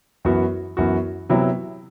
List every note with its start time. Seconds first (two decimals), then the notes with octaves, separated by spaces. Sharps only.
0.25 F#2 E3 B3 F#4
0.77 F#2 E3 B3 F#4
1.30 C3 F#3 B3 E4